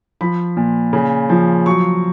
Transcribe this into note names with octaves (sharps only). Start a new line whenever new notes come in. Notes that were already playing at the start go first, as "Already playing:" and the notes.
F3 B5
A#2
C#3
F3
F#3 C#6